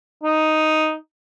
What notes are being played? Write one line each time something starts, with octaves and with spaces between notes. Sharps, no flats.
D#4